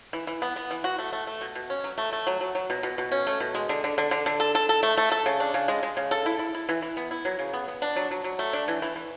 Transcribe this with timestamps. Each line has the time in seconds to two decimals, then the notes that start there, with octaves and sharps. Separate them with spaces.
0.13 E3
0.27 E3
0.42 B3
0.56 B3
0.71 E3
0.84 F#4
0.98 A3
1.12 A3
1.27 A3
1.41 B2
1.55 B2
1.70 C#4
1.84 F#3
1.98 A3
2.13 A3
2.27 F#3
2.40 F#3
2.55 F#3
2.70 B2
2.83 B2
2.98 B2
3.12 C#4
3.27 A3
3.40 B2
3.55 G#3
3.69 D3
3.84 D3
3.98 D3
4.11 D3
4.26 D3
4.40 A4
4.55 A4
4.69 A4
4.83 A3
4.97 A3
5.12 A4
5.26 C#3
5.40 D4
5.54 C#3
5.68 G#3
5.83 G#3
5.97 C#3
6.11 A4
6.26 E4
6.39 E4
6.54 E4
6.69 E3
6.82 E3
6.97 B3
7.11 E4
7.25 F#3
7.39 C#3
7.53 B3
7.68 B3
7.82 D4
7.96 F#3
8.11 F#3
8.24 F#3
8.39 A3
8.53 D4
8.68 E3
8.82 E3
8.96 E3